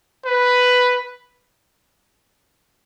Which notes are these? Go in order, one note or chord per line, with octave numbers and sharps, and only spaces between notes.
B4